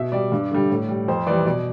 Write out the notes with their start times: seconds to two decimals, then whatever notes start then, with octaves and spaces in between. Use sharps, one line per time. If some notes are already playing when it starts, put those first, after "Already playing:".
Already playing: B2 E5
0.12 G3 D5
0.32 G2
0.51 D3 G3
0.70 A2
0.89 G3
1.08 F2 C5
1.27 E3 G3 D5
1.46 B2 D5